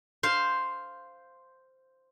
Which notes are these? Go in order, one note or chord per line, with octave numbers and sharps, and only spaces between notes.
C5 F5